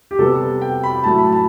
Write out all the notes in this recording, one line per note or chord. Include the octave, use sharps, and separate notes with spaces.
G4
C3 G3 B3 A4
G5
B5
A2 F#3 A3 A5
B5
A5